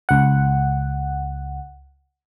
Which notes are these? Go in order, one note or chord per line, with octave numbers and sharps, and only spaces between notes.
C#2 F#5